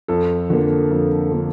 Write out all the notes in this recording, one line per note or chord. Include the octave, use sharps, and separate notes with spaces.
F2 A4
D3 F3 A#3
F2
D3 F3 A#3